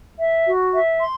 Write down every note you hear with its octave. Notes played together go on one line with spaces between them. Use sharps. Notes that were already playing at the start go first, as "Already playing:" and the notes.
E5
F#4
E5
C6